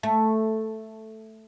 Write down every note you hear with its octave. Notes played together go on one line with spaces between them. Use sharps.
A3